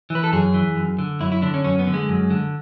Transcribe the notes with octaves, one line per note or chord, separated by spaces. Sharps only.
E3
B4
A4
F#2 G#4
E3
F#2
D3
F#2 E4
E4
D3 D4
C#4
F#2 C#4
B3
D3
G#3
F#2
D3